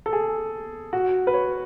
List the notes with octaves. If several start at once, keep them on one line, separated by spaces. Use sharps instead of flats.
A4
G#4
F#4
B4
C#5